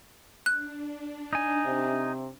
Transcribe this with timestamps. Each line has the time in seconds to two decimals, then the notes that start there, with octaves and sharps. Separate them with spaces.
0.46 D4 F#6
1.33 D#4 G#5
1.65 C3